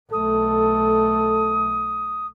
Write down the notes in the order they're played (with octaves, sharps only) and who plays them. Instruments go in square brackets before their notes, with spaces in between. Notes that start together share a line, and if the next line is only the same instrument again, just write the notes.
[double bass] B1 A3 [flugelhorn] A4 [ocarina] D#6